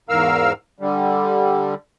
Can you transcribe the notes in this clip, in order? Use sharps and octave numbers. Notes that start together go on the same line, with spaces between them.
E2 G#2 A#4 F5 E6 F6
D3 G3